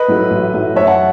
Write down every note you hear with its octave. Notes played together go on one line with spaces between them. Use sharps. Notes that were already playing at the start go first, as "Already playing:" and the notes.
Already playing: B4 D#5
A2 F#3 A3
A1
A2 F#3 A3
F#2 C#5 E5
F#5 A5